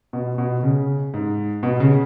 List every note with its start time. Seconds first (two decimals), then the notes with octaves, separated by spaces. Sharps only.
0.13 B2
0.38 B2
0.63 C#3
1.14 G#2
1.63 B2
1.80 C#3